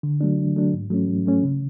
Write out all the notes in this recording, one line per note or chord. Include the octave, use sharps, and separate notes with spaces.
D3
F#3 A3 D4
D3
F#3 A3 D4
G#2
F#3 A3 C#4
G#2
F#3 A3 C#4
C#3